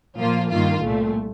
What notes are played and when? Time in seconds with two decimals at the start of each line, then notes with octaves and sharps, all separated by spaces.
0.18 A#2 F3 A#3 F4
0.51 G2 D#3 A#3 F4
0.83 C2 A#2 A3